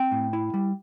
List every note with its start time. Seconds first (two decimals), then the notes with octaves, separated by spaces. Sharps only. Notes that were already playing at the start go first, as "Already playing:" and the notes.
Already playing: C4 G5
0.12 A2
0.33 E4
0.54 G3